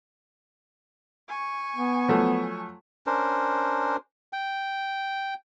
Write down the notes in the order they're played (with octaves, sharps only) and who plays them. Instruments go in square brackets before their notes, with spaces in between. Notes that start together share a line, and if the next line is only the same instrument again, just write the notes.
[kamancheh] G#5 C#6
[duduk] B3
[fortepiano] F3 F#3 A3
[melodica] C#4 D4 A#4 C5
G5